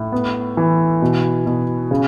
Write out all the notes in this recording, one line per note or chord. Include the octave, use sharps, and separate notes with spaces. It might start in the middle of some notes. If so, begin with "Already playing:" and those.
Already playing: A2
B3
E3
B2
B2
C#3